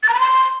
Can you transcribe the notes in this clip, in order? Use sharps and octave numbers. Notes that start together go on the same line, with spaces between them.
A6
A#5
B5
C6